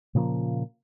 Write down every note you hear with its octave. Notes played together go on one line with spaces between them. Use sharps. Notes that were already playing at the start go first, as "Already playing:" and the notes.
A#2 C#3 F3 A#3